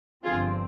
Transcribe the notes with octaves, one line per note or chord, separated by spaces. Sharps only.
G1 G2 D3 F3 C4 F4 G#4